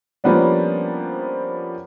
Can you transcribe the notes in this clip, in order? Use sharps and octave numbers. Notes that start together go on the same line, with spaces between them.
F3 G3 A#3 B3 C#4 D4